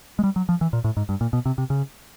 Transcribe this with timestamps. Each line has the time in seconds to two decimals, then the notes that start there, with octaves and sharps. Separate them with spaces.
0.19 G#3
0.24 G3
0.36 F#3
0.49 F3
0.61 E3
0.73 A#2
0.84 A2
0.97 G#2
1.09 G2
1.21 A#2
1.33 B2
1.46 C3
1.58 C3
1.70 C#3